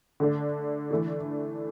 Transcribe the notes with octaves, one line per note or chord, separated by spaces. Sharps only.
D3 A3 D4
E3 A3 D4